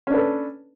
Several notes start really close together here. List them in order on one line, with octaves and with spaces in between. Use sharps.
C#4 D4 B4 A4